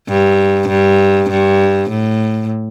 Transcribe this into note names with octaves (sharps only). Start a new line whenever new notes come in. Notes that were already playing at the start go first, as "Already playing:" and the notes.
G2
G2
G2
A2